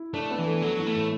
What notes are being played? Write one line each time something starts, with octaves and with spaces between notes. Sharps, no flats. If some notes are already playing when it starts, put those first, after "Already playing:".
Already playing: E4
A3 D4
B3
E3
A3
F#3 A3
E3
A3
A2